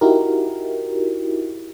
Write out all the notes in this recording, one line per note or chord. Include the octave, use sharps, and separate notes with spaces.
D#4 E4 F#4 G4 A#4